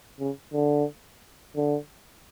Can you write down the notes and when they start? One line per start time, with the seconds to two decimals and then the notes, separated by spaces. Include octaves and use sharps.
0.20 C#3
0.53 D3
1.56 D3